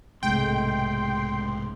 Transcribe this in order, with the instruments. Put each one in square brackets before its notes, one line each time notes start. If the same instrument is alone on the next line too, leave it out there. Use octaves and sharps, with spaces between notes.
[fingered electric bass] B1 G#2 [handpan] C3 G#3 A3 [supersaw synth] G5 [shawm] C6